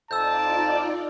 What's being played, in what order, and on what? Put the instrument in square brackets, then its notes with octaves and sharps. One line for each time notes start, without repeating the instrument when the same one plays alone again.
[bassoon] F2 [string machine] D#4 F4 D5 [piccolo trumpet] A5 [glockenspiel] E6 G6